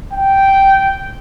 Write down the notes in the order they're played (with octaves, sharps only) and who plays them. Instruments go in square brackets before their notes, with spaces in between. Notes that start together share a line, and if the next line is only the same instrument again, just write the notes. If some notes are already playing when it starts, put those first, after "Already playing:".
[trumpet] G5